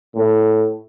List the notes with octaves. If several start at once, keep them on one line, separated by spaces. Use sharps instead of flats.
A2